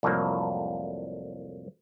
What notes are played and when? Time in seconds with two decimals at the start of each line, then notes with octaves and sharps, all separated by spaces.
0.03 C2 F2 A2 F#3 A#3